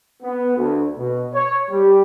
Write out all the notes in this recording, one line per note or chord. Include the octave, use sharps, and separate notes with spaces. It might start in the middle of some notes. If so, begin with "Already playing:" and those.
B3
D2
B2
C#5
G3